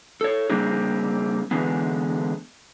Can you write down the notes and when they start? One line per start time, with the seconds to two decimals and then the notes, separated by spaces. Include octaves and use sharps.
0.21 A4 C#5
0.49 C#3 G3 A#3 C4 D4 G#4
1.51 D3 E3 G#3 B3